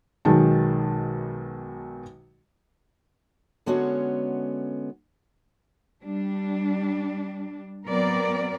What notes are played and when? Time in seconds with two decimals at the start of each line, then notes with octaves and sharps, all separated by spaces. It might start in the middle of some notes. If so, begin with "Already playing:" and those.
0.25 B1 B2 D#3 G#3 A5
3.66 D3 G#3 B3 C#4 F#4 C#5
6.04 G3 D4
7.88 F#3 B3 C4 A#4 D5